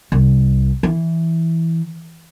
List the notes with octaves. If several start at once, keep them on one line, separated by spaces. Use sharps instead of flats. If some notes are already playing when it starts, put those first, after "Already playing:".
C2
E3